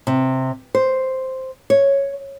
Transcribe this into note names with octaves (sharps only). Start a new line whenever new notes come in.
C3
C5
C#5